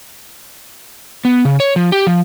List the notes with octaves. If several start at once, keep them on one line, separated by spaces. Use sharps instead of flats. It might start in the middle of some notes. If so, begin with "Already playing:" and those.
B3
C#3
C#5
F3
G4
F3